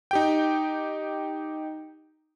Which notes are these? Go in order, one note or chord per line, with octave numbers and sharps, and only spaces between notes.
D#4 G4 G5